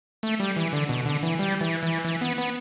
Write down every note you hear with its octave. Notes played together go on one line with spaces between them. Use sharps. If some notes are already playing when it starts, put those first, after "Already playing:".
A3
G3
E3
D3
B2
D3
E3
G3
E3
E3
E3
B3
B3